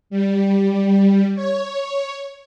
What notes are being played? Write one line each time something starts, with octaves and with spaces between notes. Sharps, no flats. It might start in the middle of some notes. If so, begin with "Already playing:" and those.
G3
C#5